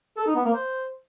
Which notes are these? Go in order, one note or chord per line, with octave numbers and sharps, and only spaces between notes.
A4
D#4
B3
A#3
C5